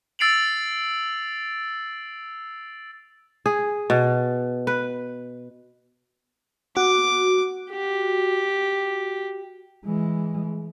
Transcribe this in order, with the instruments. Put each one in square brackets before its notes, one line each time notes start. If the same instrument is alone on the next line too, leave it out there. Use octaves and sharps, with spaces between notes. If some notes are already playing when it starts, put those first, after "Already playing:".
[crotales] E6 A6 C7 D7 F7 F#7
[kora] G#4
B2
B4
[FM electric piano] F#4 [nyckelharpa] D6
[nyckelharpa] G4
[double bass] E3 G#3